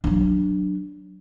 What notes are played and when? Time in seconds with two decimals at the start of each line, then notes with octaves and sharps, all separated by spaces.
0.04 F#3 D4